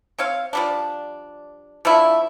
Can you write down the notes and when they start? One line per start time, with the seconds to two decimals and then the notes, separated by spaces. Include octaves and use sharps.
0.18 C4 C#5 F5
0.53 F3 G3 D4
1.85 F3 A3 D4 E4